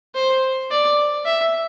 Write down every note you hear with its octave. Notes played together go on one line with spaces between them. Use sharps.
C5
D5
E5